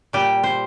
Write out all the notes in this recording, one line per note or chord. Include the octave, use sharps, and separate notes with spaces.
A#2 G3 G4
C5